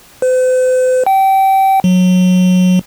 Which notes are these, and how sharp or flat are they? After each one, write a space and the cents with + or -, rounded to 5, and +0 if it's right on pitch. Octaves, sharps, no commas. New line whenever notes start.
C5 -45
G5 -25
F#3 -20